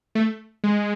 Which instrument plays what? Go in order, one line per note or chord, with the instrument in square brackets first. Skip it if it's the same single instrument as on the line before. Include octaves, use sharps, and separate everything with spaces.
[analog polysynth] A3
G#3